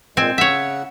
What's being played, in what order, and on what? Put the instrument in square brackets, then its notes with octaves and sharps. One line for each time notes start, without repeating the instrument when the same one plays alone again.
[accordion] A#2 G#3 [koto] C4 G#5
[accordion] C#3 F#5 [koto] C#5 E5